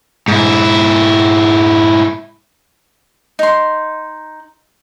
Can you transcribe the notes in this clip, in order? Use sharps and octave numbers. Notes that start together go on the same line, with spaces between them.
G#2 E4
D#4 C6